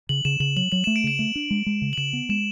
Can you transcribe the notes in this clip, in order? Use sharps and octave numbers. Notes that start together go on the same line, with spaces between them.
C#3 F#7
C#3 E7
C#3 F#7
F#3 F#7
F#3 F#7
A3 E7
D7
C#3 E7
A3
D4
G#3
G#3
C#3
F#7
C#3 E7
B3
G#3 E7